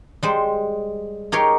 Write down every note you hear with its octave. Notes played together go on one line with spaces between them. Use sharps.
G3 G#3 C5
D#4 G4 G#4 A#4 C#5